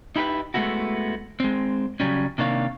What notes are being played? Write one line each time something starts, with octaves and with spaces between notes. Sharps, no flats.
D#4 E4 G4 A#4 B4
G#3 A3 B3 E4 F#4
G#3 C4
C#3 F#3 G3 C#4
C3 D#3 A#3 D4 C#5 F5